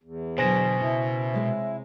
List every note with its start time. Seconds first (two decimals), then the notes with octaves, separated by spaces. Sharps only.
0.04 E2
0.38 B2 D3 F#3 C5 G#5 A#6
0.80 C#3 E4
1.34 C3 G#3 C#5